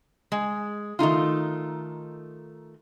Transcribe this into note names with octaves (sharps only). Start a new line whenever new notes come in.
G#3
D#3 A3 D#4 F4